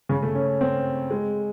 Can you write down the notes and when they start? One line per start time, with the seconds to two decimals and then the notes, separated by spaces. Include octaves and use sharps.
0.09 C#3
0.23 A3
0.35 C#4
0.61 C4
1.10 G#3